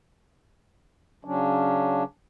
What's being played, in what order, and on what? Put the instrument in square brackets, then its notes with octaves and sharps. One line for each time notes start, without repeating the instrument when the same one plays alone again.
[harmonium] C#3 F#3 C#4 D4